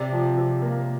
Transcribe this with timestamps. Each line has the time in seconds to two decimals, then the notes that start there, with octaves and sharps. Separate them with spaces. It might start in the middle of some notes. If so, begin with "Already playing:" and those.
Already playing: C3 D5
0.12 F3
0.37 C3
0.62 A#3